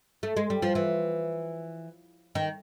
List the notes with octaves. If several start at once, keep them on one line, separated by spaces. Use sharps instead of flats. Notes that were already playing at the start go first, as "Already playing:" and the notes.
A3
G#3
G3
F3
E3
D#3